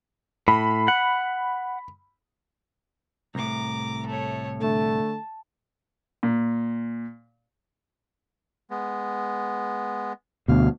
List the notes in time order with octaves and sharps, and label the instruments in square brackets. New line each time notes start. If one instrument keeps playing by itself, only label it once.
[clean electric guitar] A2 [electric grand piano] B5
[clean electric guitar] F#5
[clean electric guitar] C2 A2 [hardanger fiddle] A#5 D6
[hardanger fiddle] A3 C#5
[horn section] D3 A3 [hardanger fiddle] A5
[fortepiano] A#2
[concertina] G#3 B3
[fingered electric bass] D2 B2 [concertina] F5